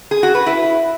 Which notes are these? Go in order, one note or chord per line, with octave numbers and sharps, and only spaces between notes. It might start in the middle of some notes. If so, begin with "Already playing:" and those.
G#4
F#4
B4
E4